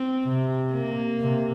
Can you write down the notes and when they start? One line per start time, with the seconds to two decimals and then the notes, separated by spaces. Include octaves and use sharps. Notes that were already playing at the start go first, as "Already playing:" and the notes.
Already playing: C4
0.26 C3
0.72 A#3
1.21 C3